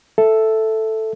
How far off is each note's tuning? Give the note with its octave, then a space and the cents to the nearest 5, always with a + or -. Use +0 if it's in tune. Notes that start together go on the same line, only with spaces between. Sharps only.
A4 +0 E5 +0